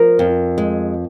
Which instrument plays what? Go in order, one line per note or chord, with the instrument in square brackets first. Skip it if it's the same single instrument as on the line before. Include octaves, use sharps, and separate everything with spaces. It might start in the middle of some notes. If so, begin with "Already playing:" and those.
Already playing: [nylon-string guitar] F3 A#4
F2
G#3